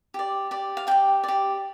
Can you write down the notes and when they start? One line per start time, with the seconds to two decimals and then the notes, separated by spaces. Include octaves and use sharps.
0.14 G4 D5
0.51 G4 D5
0.77 F5
0.87 G4 D5 G5
1.23 G4 D5